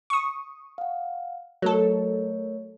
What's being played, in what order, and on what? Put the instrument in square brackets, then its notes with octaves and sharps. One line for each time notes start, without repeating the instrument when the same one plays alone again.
[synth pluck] C#6 D#6
[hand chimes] F5 F#5
[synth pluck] F#3 A4 [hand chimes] A3 A#4 C#5